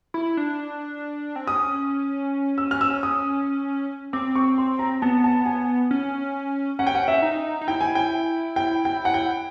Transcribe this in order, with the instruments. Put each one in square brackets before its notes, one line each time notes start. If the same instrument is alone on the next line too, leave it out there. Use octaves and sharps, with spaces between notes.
[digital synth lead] E4
D4
C4
[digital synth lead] C#4 [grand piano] D#6
[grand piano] E6
F6
E6
D#6
[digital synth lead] C4 [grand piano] D6
[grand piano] C#6
C6
A#5
[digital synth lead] B3 [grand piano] A5
[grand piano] A5
G#5
[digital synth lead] C#4
[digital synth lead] C#4 [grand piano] F#5
[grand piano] G5
F#5
E5
[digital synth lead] D#4
D#4
[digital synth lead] E4 [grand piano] G5
[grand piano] G#5
G5
G5
G5
F#5
G5